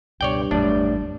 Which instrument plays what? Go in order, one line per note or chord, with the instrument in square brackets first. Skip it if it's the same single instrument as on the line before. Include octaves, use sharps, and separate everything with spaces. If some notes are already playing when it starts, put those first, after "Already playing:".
[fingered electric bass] C#2 B2 [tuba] G2 [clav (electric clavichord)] C#5 D5 G5
[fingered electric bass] G1 E2 [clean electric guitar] A2 F#3 D5 [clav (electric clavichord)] D4